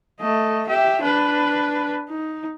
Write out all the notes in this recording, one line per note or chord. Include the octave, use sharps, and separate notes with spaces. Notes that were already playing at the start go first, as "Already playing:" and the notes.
A3 D#5
G4 E5
D4 B4
D#4